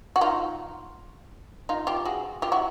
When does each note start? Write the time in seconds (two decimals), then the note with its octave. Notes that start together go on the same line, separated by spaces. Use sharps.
0.16 F#4
0.21 D#4 F4
1.69 D#4 F4
1.87 F4 G4
2.05 F#4 G#4
2.42 F4 G4
2.52 E4 F#4